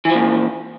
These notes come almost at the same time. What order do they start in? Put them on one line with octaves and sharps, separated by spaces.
E3 F3 A#2